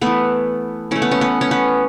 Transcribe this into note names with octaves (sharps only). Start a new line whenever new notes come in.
E3 A3 B3
E3 A3 C#4
B3
C#4
B3
C#4
B3